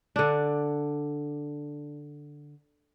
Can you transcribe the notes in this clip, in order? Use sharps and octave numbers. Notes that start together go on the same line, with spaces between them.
D3 D4